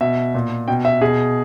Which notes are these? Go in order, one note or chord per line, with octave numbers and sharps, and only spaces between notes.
B2 E5
A#2
B2 G5
E5
B2 G#4